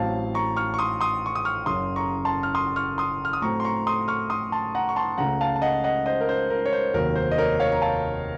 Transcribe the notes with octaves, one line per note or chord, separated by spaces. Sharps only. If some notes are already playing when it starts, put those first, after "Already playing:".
Already playing: A1 A2 F#3 C4 F5 A5
A#5 C#6
C#6 F6
C#6
C6 D#6
C6 D#6
C#6
D#6
C#6 F6
F#1 F#2 C#3 C6 D#6
A#5 C#6
A5 C6
F6
C6 D#6
C#6 F6
C6 D#6
F6
D#6
A2 F#3 A3 C4 A#5 C#6
C6
A#5 C#6
C6 D#6
C#6 F6
C6 D#6
A5 C6
F#5 A#5
C#6
A5 C6
C#2 C#3 A3 F#5 A#5
F5 A5
A5
D#5 F#5
D#5 F#5
C5 D#5
A#4
C5
A#4
C#5
C5
F1 D#2 D#3 F#3 A#4
C5
D#5
A#4 C#5
C#5 F5
A#5
F5 A5